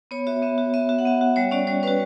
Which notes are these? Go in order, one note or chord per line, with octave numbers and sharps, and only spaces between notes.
B3 C#5
F#4 E5
B3 E5
F#4
B3 E5
F#4 E5
F#5
B3 E5
F#4
G3 C#5
C#4 F#4 D5
G3 C#5
C#4 F#4 B4